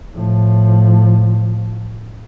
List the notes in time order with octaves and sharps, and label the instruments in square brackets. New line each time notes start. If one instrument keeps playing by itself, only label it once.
[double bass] A2 F3